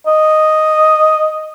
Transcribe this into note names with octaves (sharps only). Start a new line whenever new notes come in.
D#5